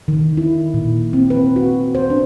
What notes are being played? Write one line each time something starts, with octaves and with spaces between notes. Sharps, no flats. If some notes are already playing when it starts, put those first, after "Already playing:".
D#3
E4
A#2
C4
B4
F#4
C5
D4